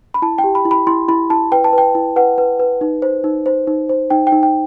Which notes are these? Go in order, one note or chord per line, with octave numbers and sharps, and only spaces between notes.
B5
E4 A5
G5
G4
B5
E4
B5
E4 C6
E4 B5
E4 A5
B4 G5
A5
B4 G5
E4
B4 F#5
B4
B4
D#4
C5
D#4
C5
D#4
C5
D#4 G5
G5
D#4
G5